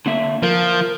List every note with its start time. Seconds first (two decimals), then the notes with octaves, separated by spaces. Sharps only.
0.06 D3 A#3 E5
0.43 F3 A#4